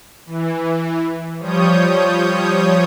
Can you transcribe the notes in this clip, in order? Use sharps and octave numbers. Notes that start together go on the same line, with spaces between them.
E3
F3 G3 C#5 D#6 G6